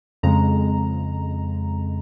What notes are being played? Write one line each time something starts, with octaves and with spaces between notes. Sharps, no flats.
F2 C#3 G#3 A#5